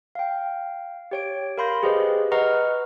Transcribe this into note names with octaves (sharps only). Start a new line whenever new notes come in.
F5 G5
G4 C#5 D7
A#4 F5 B5 C6 G6 A#6
G4 G#4 B4 C5 D5 D#5
B4 D#5 F#5 A#5 C#6 F6